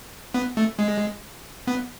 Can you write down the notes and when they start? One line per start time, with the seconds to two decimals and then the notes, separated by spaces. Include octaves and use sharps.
0.34 B3
0.57 A3
0.79 G#3
1.67 B3